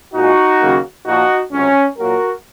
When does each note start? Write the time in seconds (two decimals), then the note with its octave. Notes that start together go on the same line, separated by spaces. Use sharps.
0.14 A#2 G#3 D#4 F#4
0.60 D#2 C#3 F#3 A#3
1.06 A#2 F3 A#3 D#4 F#4
1.52 C#2 C3 F#3 C#4
1.98 A#2 F#3 A#3 F#4 A#4